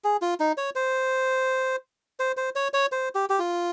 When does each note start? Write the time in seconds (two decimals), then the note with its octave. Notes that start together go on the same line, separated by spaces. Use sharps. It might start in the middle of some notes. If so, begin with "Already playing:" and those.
0.04 G#4
0.22 F4
0.40 D#4
0.57 C#5
0.75 C5
2.20 C5
2.37 C5
2.56 C#5
2.74 C#5
2.92 C5
3.15 G4
3.30 G4
3.39 F4